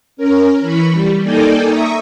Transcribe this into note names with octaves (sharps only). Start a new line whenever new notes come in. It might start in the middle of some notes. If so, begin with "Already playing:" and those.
C#4 A#4
E3 B5 C#6
G3
A#3 D#4 A4 D5 G5 G#5
E5 A#5 C#6 D#6